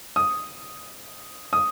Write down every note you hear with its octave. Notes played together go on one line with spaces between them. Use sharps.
D#6
D#6